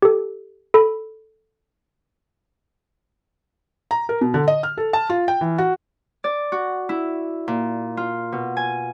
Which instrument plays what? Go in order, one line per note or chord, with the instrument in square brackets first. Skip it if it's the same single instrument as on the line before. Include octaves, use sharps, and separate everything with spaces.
[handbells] G4 A4
A4 B5
[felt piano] A#5
A#4
B2
D3
D#5
F6
A4
A5
F4
G5
E3
F#4
[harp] D5
F#4
E4
A#2
F4
B2
G#5